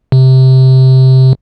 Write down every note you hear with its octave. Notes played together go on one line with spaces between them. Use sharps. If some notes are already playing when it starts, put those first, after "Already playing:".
C3